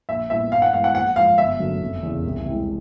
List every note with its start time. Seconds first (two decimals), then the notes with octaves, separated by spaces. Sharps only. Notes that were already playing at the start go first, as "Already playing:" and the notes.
0.09 A#1 E5
0.30 A#2 G3 B3 E4 E5
0.51 G2 F5
0.62 F#5
0.73 E3 G#3 B3 F5
0.84 F#5
0.95 A#1 F#5
1.16 G#2 F3 F5
1.38 G1 E5
1.59 F#2 D3 F#3 A3
1.81 F1
2.03 E2 C#3
2.24 C2
2.46 C3 E3 G#3